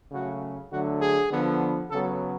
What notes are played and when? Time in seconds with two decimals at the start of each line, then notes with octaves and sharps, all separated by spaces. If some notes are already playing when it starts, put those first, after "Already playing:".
0.12 C#3 F#3 A3 F#4
0.72 D3 F#3 A3 F#4
1.01 G#4
1.31 D3 F3 B3
1.91 C#3 F#3 B3 A4